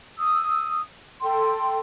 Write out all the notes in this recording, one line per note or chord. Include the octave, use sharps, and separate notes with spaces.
D#6 E6
A4 G5 C6